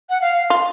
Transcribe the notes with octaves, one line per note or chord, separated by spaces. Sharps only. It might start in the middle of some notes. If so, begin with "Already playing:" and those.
F#5
F5
F4